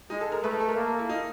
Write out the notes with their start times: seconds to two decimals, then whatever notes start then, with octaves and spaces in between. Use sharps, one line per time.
0.10 G#3 D#4
0.21 A4
0.32 A#4
0.44 A3 B4
0.51 A#4
0.60 A4
0.69 A#4
0.76 A#3
0.88 A4
0.99 E4
1.09 D#4